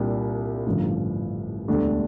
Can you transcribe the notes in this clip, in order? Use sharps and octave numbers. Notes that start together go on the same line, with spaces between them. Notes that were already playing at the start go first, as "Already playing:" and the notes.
Already playing: C2 A#2 G3 D4
A1 G2 D3 F3
E1 D2 D3 G3 D4